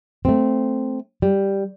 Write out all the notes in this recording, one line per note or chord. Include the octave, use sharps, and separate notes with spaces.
A3 C4
G3